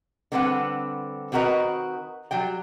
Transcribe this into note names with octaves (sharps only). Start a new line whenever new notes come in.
D3 G3 C4 A4 B4 F#5
D#3 C4 F#4 A#4 B4 D#5
F#3 G3 G5